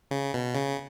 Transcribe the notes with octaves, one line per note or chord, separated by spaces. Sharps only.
C#3
B2
C#3